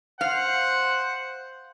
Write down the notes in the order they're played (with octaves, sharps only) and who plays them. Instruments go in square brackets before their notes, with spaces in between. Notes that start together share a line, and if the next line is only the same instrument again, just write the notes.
[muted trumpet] C5 [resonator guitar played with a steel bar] F5 [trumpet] F#5